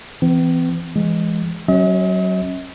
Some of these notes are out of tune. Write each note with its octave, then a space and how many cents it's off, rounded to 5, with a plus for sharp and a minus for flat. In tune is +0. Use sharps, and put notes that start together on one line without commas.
E3 +20 C4 -35
E3 +25 G#3 -5
F#3 +15 C#4 -25 D#5 +45